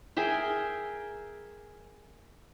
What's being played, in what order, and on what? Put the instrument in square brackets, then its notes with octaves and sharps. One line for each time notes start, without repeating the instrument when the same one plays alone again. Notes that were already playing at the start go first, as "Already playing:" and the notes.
[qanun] G#4 A#4 E5 G5